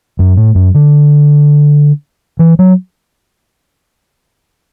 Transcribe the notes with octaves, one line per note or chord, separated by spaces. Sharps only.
F#2
A2
F#2
D3
E3
F#3